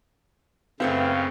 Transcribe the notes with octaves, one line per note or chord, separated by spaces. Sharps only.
F#2 C#3 A3 B3 C4 E4 F5 G5